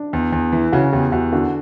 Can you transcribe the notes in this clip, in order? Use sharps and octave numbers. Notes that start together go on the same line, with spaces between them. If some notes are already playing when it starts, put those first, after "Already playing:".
Already playing: D4
E2
E2
E3
C#3 F#4
E2 G4
E2 F#4
D3 F#4